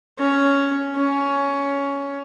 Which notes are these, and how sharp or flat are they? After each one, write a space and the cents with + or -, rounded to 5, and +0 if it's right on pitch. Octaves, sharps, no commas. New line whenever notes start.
C#4 +5
C#4 +15